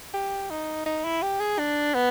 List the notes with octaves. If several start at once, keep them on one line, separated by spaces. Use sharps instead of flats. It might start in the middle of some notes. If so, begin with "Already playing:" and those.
G4
D#4
D#4
E4
G4
G#4
D4
B3